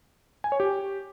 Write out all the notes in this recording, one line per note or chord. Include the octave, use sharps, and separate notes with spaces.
G#5
C#5
G4